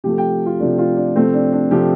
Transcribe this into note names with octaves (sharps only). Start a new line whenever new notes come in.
C3 F3 A3 G4
G5
F4
C3 F3 A3 D4
F4
D4
C3 F3 A3 C4
D4
D4
C3 F3 A3 G4